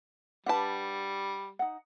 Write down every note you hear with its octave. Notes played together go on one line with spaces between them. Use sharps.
G3 D4 B4 F#5 A5
D#4 F#5